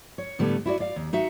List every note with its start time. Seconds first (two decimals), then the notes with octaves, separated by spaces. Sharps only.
0.18 C#5
0.39 A2 D3 G3 A3 B3
0.66 E4 F#4 D5
0.80 D5 F5
0.96 D#2
1.13 D#4 F#4 E5